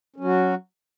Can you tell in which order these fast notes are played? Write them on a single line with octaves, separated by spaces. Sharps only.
C#4 F#3 F#4